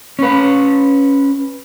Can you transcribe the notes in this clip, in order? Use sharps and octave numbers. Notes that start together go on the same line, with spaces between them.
C#4 B4